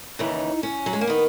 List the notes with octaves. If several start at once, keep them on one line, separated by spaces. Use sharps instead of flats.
D#2 C#3 E3 D#4
C#4
F#3
G#3
A#3
D#3 B3